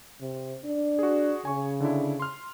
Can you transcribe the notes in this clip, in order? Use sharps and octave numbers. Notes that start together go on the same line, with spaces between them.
C3
D4
F#4 G#4
C#3 G#5 C#6
D3 D4 E4
C6 F6